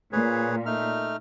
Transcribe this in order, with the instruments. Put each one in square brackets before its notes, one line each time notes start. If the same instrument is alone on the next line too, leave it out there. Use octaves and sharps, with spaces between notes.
[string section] A#2 [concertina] G#4 B4 C#5
[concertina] A3 D#4 F6